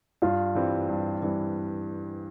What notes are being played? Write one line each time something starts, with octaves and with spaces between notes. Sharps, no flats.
G2 F4
E3 G3 C4
G2
E3 G3 C4